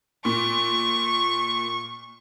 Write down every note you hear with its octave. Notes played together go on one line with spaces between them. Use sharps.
A#2 C#6